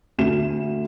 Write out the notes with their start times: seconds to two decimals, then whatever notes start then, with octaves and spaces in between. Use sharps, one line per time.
0.18 D2 E7